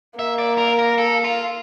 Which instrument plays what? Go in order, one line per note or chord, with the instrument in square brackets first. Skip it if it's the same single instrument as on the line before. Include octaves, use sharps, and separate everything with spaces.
[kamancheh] A#3 [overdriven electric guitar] E5
[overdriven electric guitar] D5
A#4
A#4
A4
F4